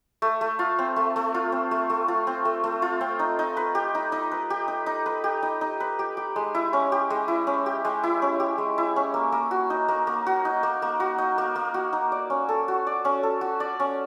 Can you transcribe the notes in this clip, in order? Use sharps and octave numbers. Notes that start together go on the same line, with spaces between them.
A3
A3
F4
C4
A3
A3
F4
C4
A3
A3
F4
C4
A3
A3
F4
C4
D#4
D#4
B4
G4
D#4
D#4
B4
G4
D#4
D#4
B4
G4
D#4
D#4
B4
G4
G4
G#3
E4
C#4
G4
G#3
E4
C#4
G4
G#3
E4
C#4
G4
G#3
E4
C#4
A#3
A#3
F#4
D#4
A#3
A#3
F#4
D#4
A#3
A#3
F#4
D#4
A#3
A#3
F#4
D#4
D5
C#4
A4
F#4
D5
C#4
A4
F#4
D5
C#4